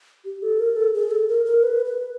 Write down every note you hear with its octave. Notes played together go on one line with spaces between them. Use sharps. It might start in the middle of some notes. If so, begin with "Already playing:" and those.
G4
A4
A#4
A4
G#4
A4
A#4
A#4
B4
B4